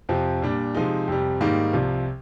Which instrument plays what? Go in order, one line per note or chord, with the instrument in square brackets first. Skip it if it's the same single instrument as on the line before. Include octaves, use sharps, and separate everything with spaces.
[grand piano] F2 C3 F3 C4
A#2 G3 D4
C3 F3 G#3 D#4
F2 C3 G3
G#2 D#3 G3 A#3 D#4
C2 C3 F3